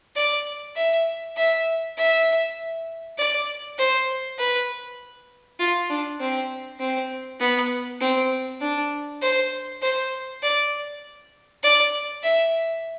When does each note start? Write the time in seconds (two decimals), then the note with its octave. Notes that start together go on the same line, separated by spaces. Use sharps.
0.16 D5
0.76 E5
1.37 E5
1.97 E5
3.18 D5
3.78 C5
4.39 B4
5.60 F4
5.90 D4
6.20 C4
6.80 C4
7.40 B3
8.01 C4
8.61 D4
9.22 C5
9.82 C5
10.43 D5
11.63 D5
12.23 E5